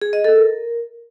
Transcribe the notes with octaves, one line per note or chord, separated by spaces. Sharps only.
G#4
D#5
A4
A#4